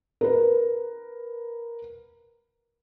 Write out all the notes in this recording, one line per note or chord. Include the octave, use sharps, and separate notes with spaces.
A#4 B4